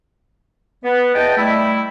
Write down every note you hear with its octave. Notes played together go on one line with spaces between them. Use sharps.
B3
E2 D#5 G5 A5
G3 A3 E4